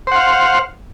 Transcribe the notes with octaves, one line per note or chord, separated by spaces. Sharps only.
C5 F5 F#5